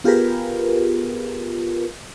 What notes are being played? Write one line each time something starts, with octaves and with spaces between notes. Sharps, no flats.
B3 F4 G4 G#4 A#4 B4